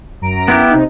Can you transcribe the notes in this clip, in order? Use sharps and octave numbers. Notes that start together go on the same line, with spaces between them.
F#2 A#5 D7
B3 E4 G4
C3 D#4